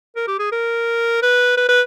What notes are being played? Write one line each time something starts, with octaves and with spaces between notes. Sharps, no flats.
A#4
G4
G#4
A#4
B4
B4
B4